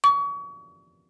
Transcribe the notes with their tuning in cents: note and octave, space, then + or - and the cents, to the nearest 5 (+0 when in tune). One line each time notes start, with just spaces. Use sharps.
C#6 +35